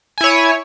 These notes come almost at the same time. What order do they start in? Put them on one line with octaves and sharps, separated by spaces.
G#5 E4 C#5